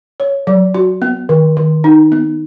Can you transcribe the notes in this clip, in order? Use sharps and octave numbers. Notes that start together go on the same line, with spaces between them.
C#5
F#3
F#4
B3
D#3
D#3
D#4
B3